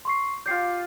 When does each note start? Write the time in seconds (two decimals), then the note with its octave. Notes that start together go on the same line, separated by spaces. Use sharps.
0.05 C6 C#6 C7
0.46 F4 G4 D5 G6 C7